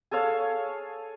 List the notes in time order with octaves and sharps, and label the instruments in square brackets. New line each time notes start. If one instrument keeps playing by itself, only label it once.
[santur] G#4 A4 C#5 F5